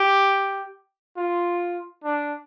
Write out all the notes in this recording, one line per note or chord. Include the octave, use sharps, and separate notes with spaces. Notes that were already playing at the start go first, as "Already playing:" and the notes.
Already playing: G4
F4
D4